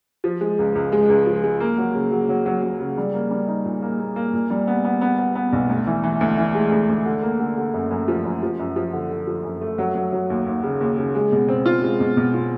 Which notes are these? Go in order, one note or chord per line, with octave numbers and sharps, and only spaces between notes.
F3
G#3
C#2
C#2
G#3
C#2
F3
G#3
A#3
F#3
C#3
F#3
F#3
F#3
F#3
C#3
G3
A#3
G3
D#4
A#2
A#3
A#3
A#3
A#2
G3
B3
B3
B3
B3
B3
B1
D2
E3
E3
D2
E3
G#3
D2
D2
D3
A#3
D3
D3
F#2
F#2
F3
F#2
F3
F#2
F3
D3
D3
F3
F#2
A3
F#3
F#3
F#3
D#2
D#2
C#3
D#2
C#3
G#3
B2
C4
F4
G#3
B2
B2
F4